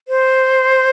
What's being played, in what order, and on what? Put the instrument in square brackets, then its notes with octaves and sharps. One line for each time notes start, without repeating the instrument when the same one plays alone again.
[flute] C5